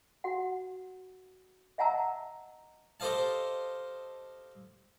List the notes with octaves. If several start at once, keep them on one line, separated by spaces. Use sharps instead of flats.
F#4 F#5
D#5 E5 F#5 A5 A#5 E6
G4 A4 C5 D#5 F5 A5